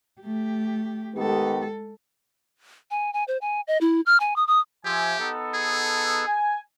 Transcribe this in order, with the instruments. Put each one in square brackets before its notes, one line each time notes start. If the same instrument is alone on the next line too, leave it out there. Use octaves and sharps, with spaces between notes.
[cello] A3 G4
[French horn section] D#3 B3 G4 [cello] G#3 A4
[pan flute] G#5
G#5
C5
G#5
D#5
E4
F6
G#5
D#6
D#6
[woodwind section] F3 E5 G#5 [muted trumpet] G4
[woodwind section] B3 D#4 A4
[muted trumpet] G#4
[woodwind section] G#5